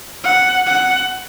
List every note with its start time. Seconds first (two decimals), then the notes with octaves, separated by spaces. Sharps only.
0.24 F#5
0.66 F#5